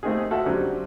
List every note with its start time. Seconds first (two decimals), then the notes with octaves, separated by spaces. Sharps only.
0.03 A3 A#3 C4 D#4 G4 G#4
0.31 F4 F#4 A4 E5 F#5
0.46 D3 F#3 G3 C4 C#4